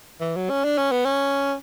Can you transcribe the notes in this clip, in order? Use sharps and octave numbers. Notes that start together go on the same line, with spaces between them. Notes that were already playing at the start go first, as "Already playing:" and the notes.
E3
F#3
C#4
D4
C#4
B3
C#4